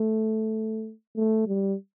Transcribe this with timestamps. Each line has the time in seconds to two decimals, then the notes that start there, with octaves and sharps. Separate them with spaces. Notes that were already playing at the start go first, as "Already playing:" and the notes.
Already playing: A3
1.16 A3
1.47 G3